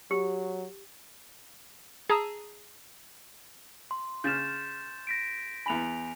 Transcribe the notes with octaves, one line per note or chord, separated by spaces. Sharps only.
F#3 G4
G#4 A5 A#5 D#6 E6
C6
C#3 F6 G6 A6 E7
A#6 B6 D7
E2 G#5 B5 F7